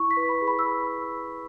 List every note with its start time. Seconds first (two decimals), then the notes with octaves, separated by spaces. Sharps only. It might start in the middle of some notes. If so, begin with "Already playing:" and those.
Already playing: E4 C#6
0.11 B6
0.17 B4
0.29 B5
0.42 G#4
0.47 B5
0.59 E6